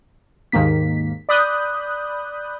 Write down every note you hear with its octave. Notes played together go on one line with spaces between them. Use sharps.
D#2 G#2 D#3 A#3 B6
D5 B5 D#6 F#6 G6